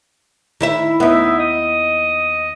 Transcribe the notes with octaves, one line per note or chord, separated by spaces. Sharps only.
D#3 E4 E5
D#2 B3 D#4 E4 E5
D#5